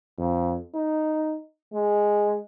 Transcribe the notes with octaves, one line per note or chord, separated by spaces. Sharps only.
F2
D#4
G#3